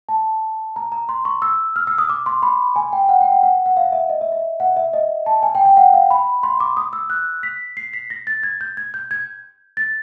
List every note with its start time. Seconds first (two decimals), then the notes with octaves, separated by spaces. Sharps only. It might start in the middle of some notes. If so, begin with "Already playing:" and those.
0.09 A5
0.76 A#5
0.92 A#5
1.09 C6
1.25 C#6
1.42 E6
1.76 F6
1.87 E6
1.98 D#6
2.09 D6
2.26 C6
2.42 B5
2.76 G#5
2.93 G5
3.09 F#5
3.21 G5
3.31 F#5
3.43 F#5
3.66 F#5
3.77 F5
3.92 E5
4.10 D#5
4.21 E5
4.32 E5
4.60 F#5
4.77 E5
4.93 D#5
5.26 A5
5.43 G#5
5.55 G5
5.65 G5
5.77 F#5
5.93 F5
6.11 B5
6.43 C6
6.60 D6
6.77 D#6
6.93 E6
7.10 F#6
7.43 B6
7.77 C7
7.93 B6
8.10 A#6
8.27 A6
8.43 G#6
8.61 G6
8.77 G#6
8.94 G6
9.11 G#6
9.77 A6